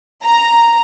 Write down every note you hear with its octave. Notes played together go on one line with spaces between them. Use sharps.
A#5